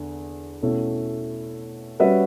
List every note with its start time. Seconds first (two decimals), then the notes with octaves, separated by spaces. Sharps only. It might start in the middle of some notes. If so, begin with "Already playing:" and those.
Already playing: E2 D3
0.62 B2 A3 C#4 E4
2.00 G3 C#4 F#4 B4 E5